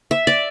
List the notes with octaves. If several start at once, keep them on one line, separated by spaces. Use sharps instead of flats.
E5
D5